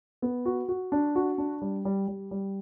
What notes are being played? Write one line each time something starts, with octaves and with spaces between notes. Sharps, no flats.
B3
F#4
F#4
D4
F#4
D4
G3
G3
G3
G3